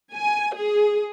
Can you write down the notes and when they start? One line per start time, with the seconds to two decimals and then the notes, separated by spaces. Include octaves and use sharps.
0.15 G#5
0.57 G#4